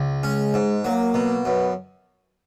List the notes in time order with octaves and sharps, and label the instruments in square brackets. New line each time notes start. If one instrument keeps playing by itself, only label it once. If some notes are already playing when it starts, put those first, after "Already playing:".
Already playing: [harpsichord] C#2
[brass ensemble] G#3 [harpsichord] C#4
[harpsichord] G#2
[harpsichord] F#3 [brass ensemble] A#3
[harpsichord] B2
[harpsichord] F#2 [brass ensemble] B3